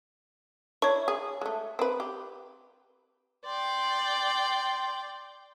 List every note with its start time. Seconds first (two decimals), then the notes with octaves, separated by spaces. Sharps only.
0.82 D4 E4 C#5 C#6
1.08 G#4
1.41 G#3 A3
1.79 C4 B4
2.00 G4
3.46 D5 G5 C6